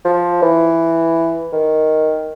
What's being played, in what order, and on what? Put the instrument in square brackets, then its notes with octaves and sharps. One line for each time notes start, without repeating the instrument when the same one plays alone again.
[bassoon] F3
E3
D#3